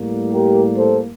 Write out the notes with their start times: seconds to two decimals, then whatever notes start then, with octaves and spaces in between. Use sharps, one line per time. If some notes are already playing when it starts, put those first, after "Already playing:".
Already playing: A2 G3 A#3
0.33 G4 A#4
0.78 A4 C5